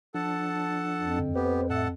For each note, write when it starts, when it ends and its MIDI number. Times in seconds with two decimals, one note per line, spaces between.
0.15 1.19 53
0.15 1.19 62
0.15 1.19 69
0.15 1.19 78
0.15 1.19 81
1.00 1.94 41
1.19 1.33 42
1.19 1.33 50
1.35 1.61 59
1.35 1.61 67
1.35 1.68 71
1.35 1.68 72
1.70 1.88 45
1.70 1.88 69
1.70 1.88 76
1.70 1.88 78
1.70 1.88 81